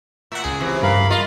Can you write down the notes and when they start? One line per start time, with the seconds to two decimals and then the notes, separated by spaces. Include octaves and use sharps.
0.32 A2 E5 F#5
0.44 C#2 G#4
0.60 C3 E3
0.83 G2 A#4 F5 B5
1.10 F4 D#5